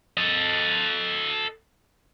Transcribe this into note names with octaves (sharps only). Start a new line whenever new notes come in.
A4 D#5